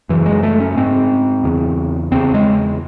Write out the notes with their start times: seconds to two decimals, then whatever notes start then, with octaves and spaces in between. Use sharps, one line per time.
0.09 F#2 C#3 E3
0.26 G#3
0.43 A3
0.60 C#4
0.77 G#2 C4
1.44 E2 C#3
2.11 E2 C#3 C4
2.34 G#3